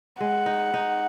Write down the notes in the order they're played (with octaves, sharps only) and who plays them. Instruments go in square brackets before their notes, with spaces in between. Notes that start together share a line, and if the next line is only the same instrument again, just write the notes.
[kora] G#3 [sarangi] F#5
[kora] D#4
D#4